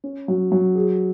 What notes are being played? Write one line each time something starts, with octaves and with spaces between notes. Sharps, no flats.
C#4
F#3
F#3
G#4